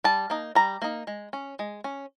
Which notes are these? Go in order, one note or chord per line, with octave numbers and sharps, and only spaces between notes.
G3 A5
A#3 D#4
G3 A#5
A#3 D#4
G#3
C#4
G#3
C#4